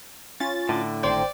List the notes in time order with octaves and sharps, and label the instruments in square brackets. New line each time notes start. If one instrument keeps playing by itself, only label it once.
[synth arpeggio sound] C#4 F4 A6
[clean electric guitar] A2 D3
[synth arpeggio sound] G#1 C5 G5 [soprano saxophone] D5